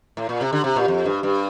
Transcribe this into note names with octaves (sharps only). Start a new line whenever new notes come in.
A2
A#2
C3
D3
C3
A#2
F2
G2
G2